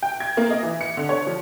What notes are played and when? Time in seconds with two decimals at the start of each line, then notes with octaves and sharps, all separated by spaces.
0.03 G5
0.20 G#6
0.37 A#3
0.50 D#5
0.63 E3
0.81 C#7
0.97 D3
1.09 C#5
1.27 F3